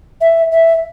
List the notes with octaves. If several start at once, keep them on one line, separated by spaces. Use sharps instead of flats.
E5
E5